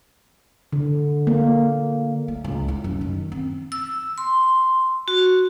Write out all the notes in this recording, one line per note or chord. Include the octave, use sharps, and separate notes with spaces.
D3
A#3
A3
C#2
E4
F#2
D#3
C4
E6
C6
F#4